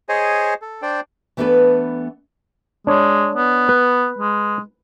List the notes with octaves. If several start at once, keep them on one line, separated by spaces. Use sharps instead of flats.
G#4 C5 C#5 D#5 G#5
A4
D4 C5 D5 G5
E3 A3 B3 D4 A4 B4
G#3 D4 C#5
B3
B4
G#3